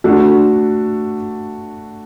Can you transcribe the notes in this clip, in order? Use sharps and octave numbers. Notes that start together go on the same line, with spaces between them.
A3 D4 F#4